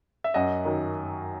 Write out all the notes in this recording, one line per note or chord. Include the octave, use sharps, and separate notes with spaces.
E5
F#2 D#5 F#5
D#3 F#3